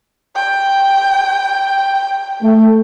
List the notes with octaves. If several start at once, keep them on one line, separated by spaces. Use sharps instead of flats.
G5
A3